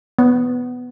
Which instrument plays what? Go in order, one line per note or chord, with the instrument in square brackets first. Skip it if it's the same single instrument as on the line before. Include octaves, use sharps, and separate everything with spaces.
[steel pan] B3